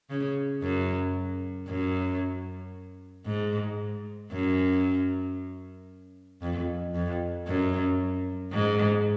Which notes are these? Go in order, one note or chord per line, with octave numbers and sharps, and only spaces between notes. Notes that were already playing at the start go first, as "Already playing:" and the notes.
C#3
F#2
F#2
G#2
F#2
F2
F2
F#2
G#2